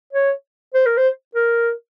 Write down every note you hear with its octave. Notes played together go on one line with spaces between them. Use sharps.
C#5
C5
A#4
C5
A#4